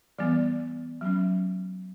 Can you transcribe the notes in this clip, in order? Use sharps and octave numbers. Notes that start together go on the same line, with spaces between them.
E3 G3 B3 D5
F#3 C#4